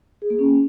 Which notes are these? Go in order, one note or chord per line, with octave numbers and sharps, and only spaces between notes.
G#4
A#3
C#4